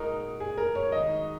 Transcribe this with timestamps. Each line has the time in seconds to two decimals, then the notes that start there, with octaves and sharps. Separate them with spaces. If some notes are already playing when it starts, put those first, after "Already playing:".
Already playing: A#2 G#3 D#4 F#4 A#4
0.40 G#4
0.58 A#4
0.75 C#5
0.92 D#3 G#3 D#4 F#4 D#5